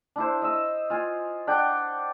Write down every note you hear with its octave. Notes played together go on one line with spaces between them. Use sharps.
D4 E4 C5
D#5 E6
F4 G#5
D4 D5 F#5 G5